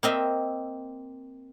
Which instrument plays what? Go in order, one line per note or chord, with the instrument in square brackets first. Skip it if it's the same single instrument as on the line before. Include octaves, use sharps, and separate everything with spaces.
[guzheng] A#3 C4 D#5 E5